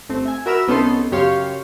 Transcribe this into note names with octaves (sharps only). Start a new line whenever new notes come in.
G1 A3 C4
E5 G#5
F#4 A#4 E5 B5 E6 F6
C2 B3 C#4 D#4 A4 C6
F#2 C#3 G4 C#5 F5 C6